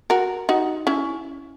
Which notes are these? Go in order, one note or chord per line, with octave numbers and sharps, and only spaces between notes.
F#4 A#4
D#4 F#4
C#4 E4